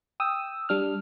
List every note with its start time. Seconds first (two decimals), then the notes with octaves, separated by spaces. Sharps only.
0.20 G5 D#6 E6
0.69 G3 D4 F6